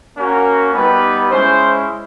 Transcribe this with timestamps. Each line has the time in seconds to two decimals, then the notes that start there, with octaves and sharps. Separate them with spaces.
0.16 A#3 C#4 F#4 A#4
0.73 G3 B3 D#4 G4 B4
1.30 G#3 C#4 E4 C5